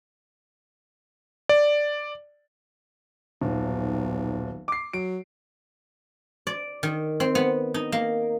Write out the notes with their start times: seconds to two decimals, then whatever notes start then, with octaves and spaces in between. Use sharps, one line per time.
1.49 D5
3.41 D#1 B1
4.68 D6 C7
4.93 F#3 D7
6.47 D5
6.83 D#3
7.20 C4
7.35 B3
7.74 D#4
7.92 A#3